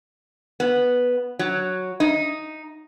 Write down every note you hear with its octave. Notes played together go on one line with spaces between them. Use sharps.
B3
F#3
D#4